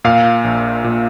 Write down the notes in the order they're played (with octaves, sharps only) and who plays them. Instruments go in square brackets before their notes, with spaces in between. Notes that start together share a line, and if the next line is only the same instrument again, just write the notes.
[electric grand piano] A#2 [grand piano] F5
[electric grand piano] A#1
A#2